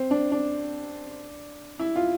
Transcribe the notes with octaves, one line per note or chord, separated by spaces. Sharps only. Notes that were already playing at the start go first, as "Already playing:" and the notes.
Already playing: C4
D4
D4
E4
F4